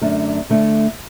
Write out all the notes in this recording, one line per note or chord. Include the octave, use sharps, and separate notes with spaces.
F#2 D3 A3 D4
D3 A3 D4